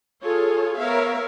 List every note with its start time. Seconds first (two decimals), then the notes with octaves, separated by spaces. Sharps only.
0.22 F4 G#4 A4 C#5
0.78 B3 A#4 C#5 E5 F5